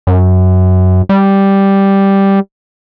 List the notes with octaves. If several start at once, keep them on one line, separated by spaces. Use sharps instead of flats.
F#2
G3